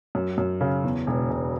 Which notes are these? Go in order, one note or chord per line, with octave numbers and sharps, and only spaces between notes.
F#2
F#2
C#3
E2
E1
E1